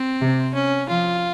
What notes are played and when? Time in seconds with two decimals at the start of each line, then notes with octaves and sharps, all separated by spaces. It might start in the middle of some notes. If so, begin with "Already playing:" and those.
Already playing: C4
0.21 C3
0.55 C#4
0.89 F3 F4